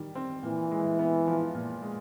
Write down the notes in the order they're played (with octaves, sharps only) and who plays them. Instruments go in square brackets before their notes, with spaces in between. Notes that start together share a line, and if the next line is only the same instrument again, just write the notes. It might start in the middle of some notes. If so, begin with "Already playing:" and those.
Already playing: [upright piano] D#3 G3
C4
[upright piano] A#2 [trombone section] E3
[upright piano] G#3
B3
F3
A#2
G#3